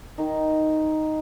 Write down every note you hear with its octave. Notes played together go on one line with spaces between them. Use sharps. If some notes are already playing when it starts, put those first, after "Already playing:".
D#3 D#4